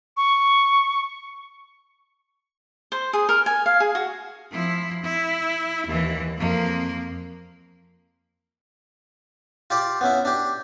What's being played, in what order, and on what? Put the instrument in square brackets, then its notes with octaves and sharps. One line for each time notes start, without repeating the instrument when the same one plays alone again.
[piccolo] C#6
[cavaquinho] C5
G#4
A#4
G#5
F5
G#4
F#4
[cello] F3 E4
E4
D#2 E3
F2 A#3
[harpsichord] F4 G4 D5
B3 C#4 E4
D4 G4